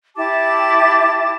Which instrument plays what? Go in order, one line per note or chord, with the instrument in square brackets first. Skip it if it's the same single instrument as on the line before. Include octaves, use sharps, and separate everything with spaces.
[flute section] E4 G4 A5 D6